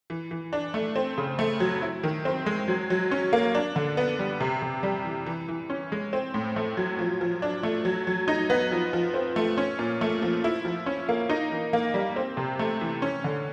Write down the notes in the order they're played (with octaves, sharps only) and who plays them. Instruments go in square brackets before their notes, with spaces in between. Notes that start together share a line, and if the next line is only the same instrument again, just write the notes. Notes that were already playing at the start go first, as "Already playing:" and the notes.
[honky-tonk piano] E3
E3
D4
A3
C4
C#3
A3
F#3
E4
D#3
C4
G#3
F#3
F#3
C#4
A#3
D4
D3
B3
G3
C3
C3
G3
E3
E3
E3
C#4
G#3
C4
A2
A3
F#3
F3
F3
D4
A3
F#3
F#3
D#4
B3
F3
F3
C4
A3
C#4
A#2
A3
F3
E4
F3
C#4
A#3
D#4
E3
A#3
G3
C4
C3
A3
E3
C#4
D3